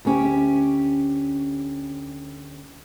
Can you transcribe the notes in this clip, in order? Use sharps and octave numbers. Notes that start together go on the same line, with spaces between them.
D2 C#4 G4